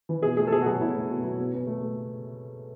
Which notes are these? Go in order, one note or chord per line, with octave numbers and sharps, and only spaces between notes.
E3
B2 G#4
A3 G#4
A4
B2 G#4
F#4
F#3 G#4
B2 E4
A3
B2
F#3
B2
B2
A3
A3